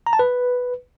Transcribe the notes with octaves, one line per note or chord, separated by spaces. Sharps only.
A#5
A5
B4